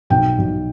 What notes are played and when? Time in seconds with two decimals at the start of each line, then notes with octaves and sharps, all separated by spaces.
0.10 B1 G5
0.38 B1